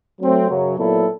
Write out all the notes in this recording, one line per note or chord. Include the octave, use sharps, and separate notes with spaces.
F#3 A3 C4
F#2 C#3 F#3
A#2 F#3 B3 E4 A4